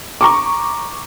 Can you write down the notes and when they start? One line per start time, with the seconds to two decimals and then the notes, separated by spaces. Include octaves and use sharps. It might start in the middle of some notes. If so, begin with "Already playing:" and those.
0.21 A#5 C#6 D6